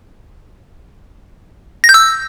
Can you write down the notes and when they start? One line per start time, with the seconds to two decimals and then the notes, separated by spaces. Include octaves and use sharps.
1.84 A#6
1.89 G6
1.94 E6